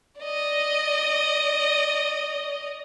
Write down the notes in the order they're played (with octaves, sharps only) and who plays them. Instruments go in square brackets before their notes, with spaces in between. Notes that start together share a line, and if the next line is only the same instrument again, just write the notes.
[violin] D5 D#5